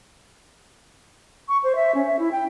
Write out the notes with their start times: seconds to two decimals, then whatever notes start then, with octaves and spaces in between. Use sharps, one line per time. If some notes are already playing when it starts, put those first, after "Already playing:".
1.48 C#6
1.64 C5
1.76 E5
1.95 C#4
2.06 E5
2.19 E4
2.32 G5